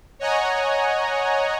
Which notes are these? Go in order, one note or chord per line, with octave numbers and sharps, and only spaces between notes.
C#5 D#5 F#5 G#5 A#5